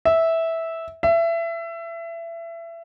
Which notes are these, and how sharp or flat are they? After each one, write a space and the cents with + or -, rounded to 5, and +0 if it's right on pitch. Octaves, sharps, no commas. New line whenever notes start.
E5 -10
E5 +25